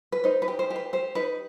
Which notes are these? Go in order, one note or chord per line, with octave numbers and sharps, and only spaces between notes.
B4
D#4 C5
B4
G4
C5
G4
B4
G4 C5
D#4 B4